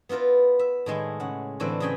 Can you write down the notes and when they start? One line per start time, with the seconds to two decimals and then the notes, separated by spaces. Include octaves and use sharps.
0.09 B3 E4 F4 A#4 B4
0.59 E5
0.86 A2 D#3 G#3 E4
1.20 C#3 F#5
1.60 A2 D3 E3 C4 D4 E4
1.80 C#3 F#3 G#4 G5 G#5 B5